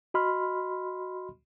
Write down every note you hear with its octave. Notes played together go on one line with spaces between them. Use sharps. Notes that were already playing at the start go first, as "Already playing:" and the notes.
F#4 D#5 B5 C6 F6